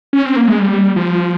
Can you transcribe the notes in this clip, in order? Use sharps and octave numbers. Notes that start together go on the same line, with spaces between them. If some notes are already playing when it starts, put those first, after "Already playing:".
C#4
C4
A#3
G#3
G3
F3